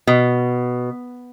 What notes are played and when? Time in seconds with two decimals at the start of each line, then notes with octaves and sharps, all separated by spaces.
0.07 B2